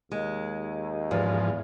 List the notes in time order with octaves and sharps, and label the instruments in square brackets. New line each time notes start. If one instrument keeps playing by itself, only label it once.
[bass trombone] D#2 [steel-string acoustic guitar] G#3
[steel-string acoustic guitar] E2 [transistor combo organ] G#2 F3